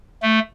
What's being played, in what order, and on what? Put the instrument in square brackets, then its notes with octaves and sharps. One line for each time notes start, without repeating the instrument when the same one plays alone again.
[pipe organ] A3